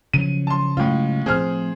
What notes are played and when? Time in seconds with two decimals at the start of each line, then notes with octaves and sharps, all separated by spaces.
0.14 C#3 F3 F#3 D#7
0.47 A5 C6
0.77 A2 C#3 F#3 G#3 F4
1.26 A2 F3 C4 G#4 C5 F6